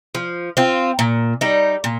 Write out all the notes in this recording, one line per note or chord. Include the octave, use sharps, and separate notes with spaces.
F3
C4 F4
A#2
G3 D#4
A#2